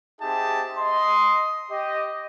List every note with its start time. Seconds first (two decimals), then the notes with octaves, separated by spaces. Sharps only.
0.22 C4 D#4 G4 G#4 E5 A5
0.78 D#5 C6
1.72 G4 D#5